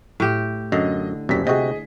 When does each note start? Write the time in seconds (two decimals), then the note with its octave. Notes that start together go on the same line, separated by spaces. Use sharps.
0.20 A2 G4
0.72 F#2 D3 D#5
1.29 D#1 F#2 G3 B6
1.47 C3 F#4 G#4 D#5